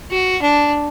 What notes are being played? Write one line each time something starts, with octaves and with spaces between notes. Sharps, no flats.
F#4
D4